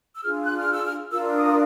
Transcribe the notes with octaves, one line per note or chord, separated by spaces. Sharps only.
E6
D4 F4 G#4 F6
F#6
F6
E6
F6
D4 F4 A#4 E6
D#6